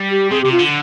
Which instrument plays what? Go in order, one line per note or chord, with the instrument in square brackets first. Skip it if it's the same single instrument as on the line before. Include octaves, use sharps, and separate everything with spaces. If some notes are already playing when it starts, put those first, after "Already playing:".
Already playing: [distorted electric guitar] G3
[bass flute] G4
[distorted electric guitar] C3 [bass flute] G#4
[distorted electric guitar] C3 [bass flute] G4
[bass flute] F4
[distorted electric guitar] D3